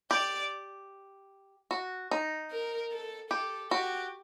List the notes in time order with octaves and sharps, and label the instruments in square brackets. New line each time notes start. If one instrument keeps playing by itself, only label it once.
[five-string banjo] G4 [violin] D5
[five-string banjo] F#4
D#4
[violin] A#4
A4
[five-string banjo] G4 [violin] A4
[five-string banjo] F#4 [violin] G4